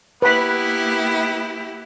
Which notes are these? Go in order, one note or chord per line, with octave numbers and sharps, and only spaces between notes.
A#3 B3 E4 G4 B4 B5